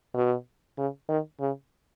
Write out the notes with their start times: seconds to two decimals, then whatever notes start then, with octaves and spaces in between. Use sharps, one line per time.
0.14 B2
0.78 C#3
1.09 D#3
1.40 C#3